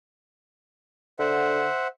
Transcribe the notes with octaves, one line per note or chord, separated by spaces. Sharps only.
D3 C5 E5 F#5